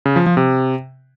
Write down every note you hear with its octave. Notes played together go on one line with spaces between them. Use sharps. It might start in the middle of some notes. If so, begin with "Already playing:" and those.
C#3
F3
F3
C3